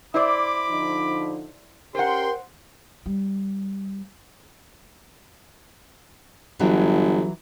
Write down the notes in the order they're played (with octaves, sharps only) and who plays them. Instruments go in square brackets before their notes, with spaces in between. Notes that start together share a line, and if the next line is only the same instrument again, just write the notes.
[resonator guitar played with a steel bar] E4 C5 D5 [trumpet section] B5 D6
[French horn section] D3 F3 D#4
[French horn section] C#4 G4 A#4 [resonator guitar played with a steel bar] C5 F#5 [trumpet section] G5 C6
[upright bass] G3
[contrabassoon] G1 [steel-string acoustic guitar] E3 F#3